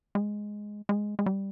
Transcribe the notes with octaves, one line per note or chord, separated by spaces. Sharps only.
G#3
G#3
G#3
G3